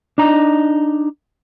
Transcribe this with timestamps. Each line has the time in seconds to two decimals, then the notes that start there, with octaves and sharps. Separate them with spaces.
0.18 D4 D#4 A#5